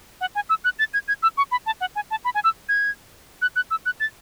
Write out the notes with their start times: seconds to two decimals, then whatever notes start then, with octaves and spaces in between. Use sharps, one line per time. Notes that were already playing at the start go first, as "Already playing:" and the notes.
0.21 F#5
0.35 G#5
0.49 E6
0.64 F#6
0.79 A6
0.94 G#6
1.08 G#6
1.23 E6
1.37 C#6
1.51 B5
1.66 A5
1.81 F#5
1.96 G#5
2.11 A5
2.25 B5
2.35 G#5
2.44 E6
2.69 G#6
3.42 F#6
3.56 F#6
3.71 E6
3.86 F#6
4.00 A6